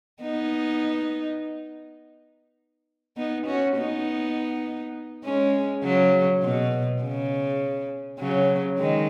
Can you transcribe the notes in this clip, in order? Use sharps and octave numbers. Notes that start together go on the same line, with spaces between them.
B3 D#4
B3 D#4
C#4 F#4
B3 D#4
G#3 C#4
C#3 F#3
B2
C#3
C#3 F#3
D#3 G#3